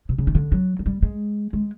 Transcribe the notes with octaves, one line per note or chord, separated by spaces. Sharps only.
C3
C#3
D#3
D3
F#3
F#3
G3
G#3
G#3